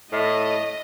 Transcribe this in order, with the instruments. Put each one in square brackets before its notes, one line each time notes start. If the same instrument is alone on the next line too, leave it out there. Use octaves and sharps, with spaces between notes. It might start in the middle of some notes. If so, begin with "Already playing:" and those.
[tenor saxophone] A2 [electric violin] D#5